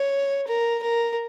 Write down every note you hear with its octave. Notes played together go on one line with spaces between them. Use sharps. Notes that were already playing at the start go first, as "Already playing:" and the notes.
Already playing: C#5
A#4
A#4